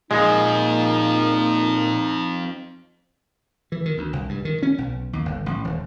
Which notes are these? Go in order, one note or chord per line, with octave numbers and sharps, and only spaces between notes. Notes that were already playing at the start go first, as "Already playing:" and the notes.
F2 A#2 F3 G#3 D#4
E3
D#3
D2
C2
G2
D#3
C#4
B1
D#2
G1
A1
D#1